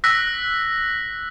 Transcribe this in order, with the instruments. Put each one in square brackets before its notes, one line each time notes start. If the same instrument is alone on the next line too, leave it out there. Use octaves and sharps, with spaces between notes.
[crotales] E6 F#6 A#6 B6